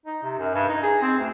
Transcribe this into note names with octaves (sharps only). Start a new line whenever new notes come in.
D#4
C3
F#2
G2
D#4
G#4
C4
D2